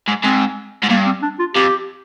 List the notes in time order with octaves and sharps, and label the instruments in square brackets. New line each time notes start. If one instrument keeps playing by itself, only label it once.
[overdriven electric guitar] G#2
[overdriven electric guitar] G#2 [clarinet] C4
[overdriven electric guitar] G#2
[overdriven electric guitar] G2 [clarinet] A#3
[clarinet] C4
D4
F4
[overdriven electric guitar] F2 [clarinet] G4